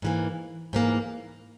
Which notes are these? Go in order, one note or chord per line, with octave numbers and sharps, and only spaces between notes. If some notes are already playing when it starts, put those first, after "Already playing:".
G#2 E3 A#3
G#2 E3 A#3